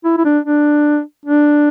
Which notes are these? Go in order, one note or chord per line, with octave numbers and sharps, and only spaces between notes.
E4
E4
D4
D4
D4